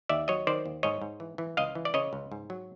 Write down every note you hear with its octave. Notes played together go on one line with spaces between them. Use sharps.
D#2 D5 E5
F#3 C#5 D#5
D#3 C5 D5
D#2
G#2 C#5 D#5
G#2
E3
E3
C#2 D#5 F5
E3
D5
C#3 C#5 D#5
C#2
G#2
F#3